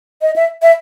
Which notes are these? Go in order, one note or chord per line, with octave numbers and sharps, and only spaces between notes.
D#5
E5
E5